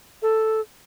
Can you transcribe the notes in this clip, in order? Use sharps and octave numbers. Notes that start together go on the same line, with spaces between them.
A4